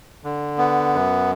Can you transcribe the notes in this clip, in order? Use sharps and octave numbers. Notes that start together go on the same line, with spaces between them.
D3
B3
F#2